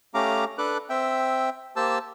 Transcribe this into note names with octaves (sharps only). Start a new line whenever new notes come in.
A3 C#4 G4 F5 A#5 D6
D4 A4 B4 D6 F#6
C4 E5 G5
A#3 G4 C5 A5 E6